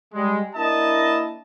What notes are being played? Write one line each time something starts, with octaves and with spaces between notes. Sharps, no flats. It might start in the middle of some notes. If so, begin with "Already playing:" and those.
G3 G#3
A#3 D4 E4 D#5 A5